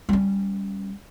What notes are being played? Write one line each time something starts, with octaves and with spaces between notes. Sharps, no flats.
G3 C#4